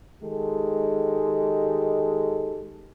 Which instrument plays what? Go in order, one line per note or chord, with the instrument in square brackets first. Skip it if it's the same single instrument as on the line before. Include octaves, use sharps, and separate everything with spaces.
[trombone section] D#3 G#3 G4 A4